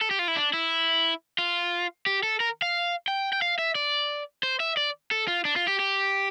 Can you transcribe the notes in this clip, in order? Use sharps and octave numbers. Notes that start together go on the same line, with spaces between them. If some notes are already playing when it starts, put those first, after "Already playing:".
A4
G4
F4
E4
D4
E4
F4
G4
A4
A#4
F5
G5
G5
F5
E5
D5
C5
E5
D5
A4
F4
D4
F4
G4
G4